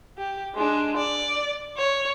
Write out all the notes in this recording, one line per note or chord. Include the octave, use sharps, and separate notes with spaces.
G4
G#3 D4
D5
C#5